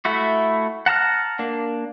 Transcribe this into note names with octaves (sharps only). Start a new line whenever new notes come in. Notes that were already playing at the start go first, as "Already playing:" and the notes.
A3 E4 F#4
F#5 A5 A#5 F6
A#3 D4